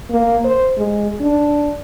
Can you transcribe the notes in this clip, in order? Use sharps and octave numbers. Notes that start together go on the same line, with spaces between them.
A#3
C5
G#3
D4